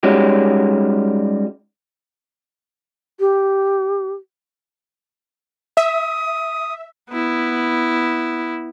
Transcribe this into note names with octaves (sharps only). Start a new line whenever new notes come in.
G3 G#3 C#4 D#4 F#4 G4
G4
E5 D#6
B3 E4